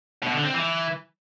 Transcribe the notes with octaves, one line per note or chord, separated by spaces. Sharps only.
B2
D3
C4
E3